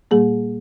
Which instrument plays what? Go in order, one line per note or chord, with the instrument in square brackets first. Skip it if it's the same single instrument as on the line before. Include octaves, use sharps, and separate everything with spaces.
[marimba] A#2 G3 A#3 G#4